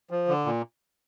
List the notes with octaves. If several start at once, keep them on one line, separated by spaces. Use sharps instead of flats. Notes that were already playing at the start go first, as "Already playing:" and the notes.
F3
D3
A#2